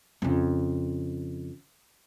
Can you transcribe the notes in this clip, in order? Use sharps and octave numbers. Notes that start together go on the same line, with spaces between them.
F2 C#3